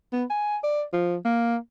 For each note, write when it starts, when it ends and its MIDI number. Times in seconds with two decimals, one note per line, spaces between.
0.13 0.25 59
0.30 0.57 80
0.64 0.83 74
0.93 1.17 53
1.25 1.57 58